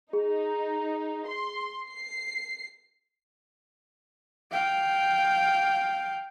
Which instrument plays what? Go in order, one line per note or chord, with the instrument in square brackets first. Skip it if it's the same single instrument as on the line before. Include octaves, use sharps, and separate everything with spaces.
[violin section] D#4 [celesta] G#4
[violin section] C6
C7
[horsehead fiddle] F5 G5